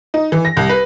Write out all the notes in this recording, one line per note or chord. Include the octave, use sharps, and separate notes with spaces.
D#4
E3
A#6
C2
B4